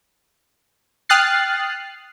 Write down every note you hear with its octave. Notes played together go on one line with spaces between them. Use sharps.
G5 D#6 F6 F#6 A6 C7